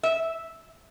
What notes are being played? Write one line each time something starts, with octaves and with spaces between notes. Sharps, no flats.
E5